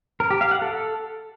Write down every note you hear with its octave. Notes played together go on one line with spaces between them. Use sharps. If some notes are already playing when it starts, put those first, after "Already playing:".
A#4
G4
F5
F#5
A4